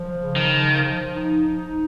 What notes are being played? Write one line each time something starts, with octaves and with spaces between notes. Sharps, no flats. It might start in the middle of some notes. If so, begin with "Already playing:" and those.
Already playing: F3
C#3
D#3
F3
F3
D#4
D#4